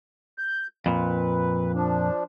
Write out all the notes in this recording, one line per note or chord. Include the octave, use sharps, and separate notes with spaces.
G6
F2 A#2 B4
F3 D4